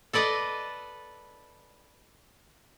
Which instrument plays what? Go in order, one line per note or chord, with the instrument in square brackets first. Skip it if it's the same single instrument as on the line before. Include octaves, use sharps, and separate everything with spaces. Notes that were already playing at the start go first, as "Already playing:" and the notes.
[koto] A4 B4 D5 D#5